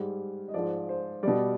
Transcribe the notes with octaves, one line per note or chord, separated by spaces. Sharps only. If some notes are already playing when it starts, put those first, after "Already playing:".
Already playing: G#2 G3
D#5
G#2 F3 D5
C5
B2 G3 D5